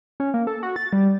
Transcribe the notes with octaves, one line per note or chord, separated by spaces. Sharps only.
C#4
A#3
A4
F#4
A6
G3